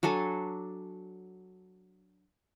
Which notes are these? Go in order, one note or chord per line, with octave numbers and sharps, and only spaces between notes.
F#3 D4 A4 G#5